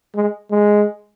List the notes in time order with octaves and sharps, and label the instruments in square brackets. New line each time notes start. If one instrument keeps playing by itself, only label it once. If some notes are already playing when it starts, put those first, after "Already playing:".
[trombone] G#3
G#3